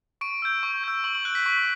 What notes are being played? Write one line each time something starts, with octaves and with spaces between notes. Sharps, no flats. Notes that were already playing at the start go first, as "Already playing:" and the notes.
C#6 D7
E6 G6
C#6
E6 G6
C#6 F#7
F#7
F#6 D7
B6
C#6 B6